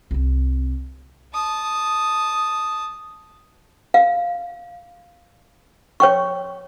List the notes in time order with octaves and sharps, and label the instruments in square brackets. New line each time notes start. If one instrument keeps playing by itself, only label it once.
[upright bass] C2 C4
[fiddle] A5 D#6
[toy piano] F5
C#5 G5 C#6